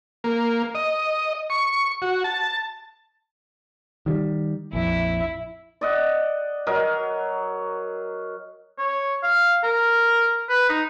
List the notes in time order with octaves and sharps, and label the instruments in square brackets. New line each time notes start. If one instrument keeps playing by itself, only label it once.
[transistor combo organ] A#3
D#5
C#6
F#4
A5
[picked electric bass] D#3 F#3 G3
[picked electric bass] A#1 F2 [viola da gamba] E4
[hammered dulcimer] D5 D#5 F#5
F#3 A#4 D#5
[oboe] C#5
F5
A#4
B4
D#4